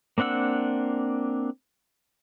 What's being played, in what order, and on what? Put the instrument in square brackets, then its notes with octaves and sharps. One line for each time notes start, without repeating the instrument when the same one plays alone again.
[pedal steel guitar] A#3 C4 D4 F#5 E6